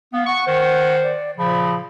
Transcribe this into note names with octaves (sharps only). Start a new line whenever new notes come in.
B3 F5
F#5 C#6
D#3 C5
D5
A#2 C#3 F3 B5